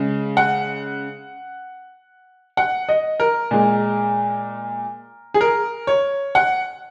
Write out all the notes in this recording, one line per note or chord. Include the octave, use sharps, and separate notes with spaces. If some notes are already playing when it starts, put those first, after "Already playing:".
Already playing: C#3 G#3
F#5
F#5
D#5
A#4
A#2 G#3
G#4
A#4
C#5
F#5